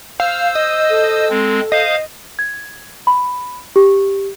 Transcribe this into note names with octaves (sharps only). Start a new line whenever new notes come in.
C5 F5 E6
D#5
A4
G#3 C4
C5 D#5 F5
G#6
B5
G4